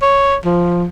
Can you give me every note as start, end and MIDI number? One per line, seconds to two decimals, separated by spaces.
0.02 0.36 73
0.45 0.85 53